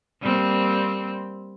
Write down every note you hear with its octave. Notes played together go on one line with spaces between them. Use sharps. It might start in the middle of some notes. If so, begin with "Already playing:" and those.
G3 A#3 C4